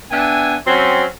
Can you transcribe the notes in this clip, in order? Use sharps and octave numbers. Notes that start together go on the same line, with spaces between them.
B3 D4 E5 G5 G#5
F#3 C4 C#4